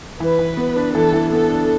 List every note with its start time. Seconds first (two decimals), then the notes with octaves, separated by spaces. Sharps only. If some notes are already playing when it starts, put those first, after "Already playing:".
0.20 E3 B4
0.39 E3
0.57 B3
0.76 D4
0.95 E3 A4
1.13 E3
1.32 B3 A4
1.49 D4